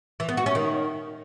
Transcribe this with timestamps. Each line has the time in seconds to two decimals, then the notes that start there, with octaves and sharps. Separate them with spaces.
0.20 E3
0.29 B3
0.37 F#4
0.46 C#4
0.55 D#3